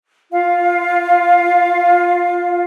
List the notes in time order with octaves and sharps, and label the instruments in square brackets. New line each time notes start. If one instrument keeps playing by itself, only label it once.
[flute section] F4 F5